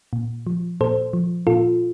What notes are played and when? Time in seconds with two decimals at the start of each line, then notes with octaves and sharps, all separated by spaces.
0.13 A#2
0.47 F3
0.81 A#2 A4 C5
1.13 F3
1.47 A#2 F4 A4